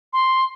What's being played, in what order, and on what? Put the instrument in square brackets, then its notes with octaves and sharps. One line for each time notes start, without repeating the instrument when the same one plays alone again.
[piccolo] C6